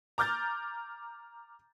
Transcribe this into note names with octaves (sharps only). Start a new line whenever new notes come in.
A#5 D6 F6 G6 A6